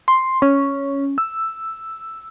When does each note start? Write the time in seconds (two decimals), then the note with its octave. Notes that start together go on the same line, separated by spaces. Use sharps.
0.08 C6
0.42 C#4
1.18 E6